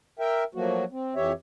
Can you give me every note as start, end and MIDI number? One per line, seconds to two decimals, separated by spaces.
0.19 0.44 70
0.19 0.44 76
0.19 0.44 79
0.55 0.84 53
0.55 0.84 54
0.55 0.84 57
0.55 0.84 58
0.55 0.84 66
0.91 1.15 60
1.16 1.32 41
1.16 1.32 52
1.16 1.32 67
1.16 1.32 73
1.16 1.32 76